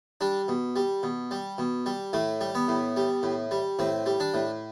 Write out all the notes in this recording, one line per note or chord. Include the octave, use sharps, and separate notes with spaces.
G3 D4
B2
G3
B2
G3
B2
G3
A2 A3
G3
B3
A2
G3
A2
G3
A2 C4
G3
D4
A2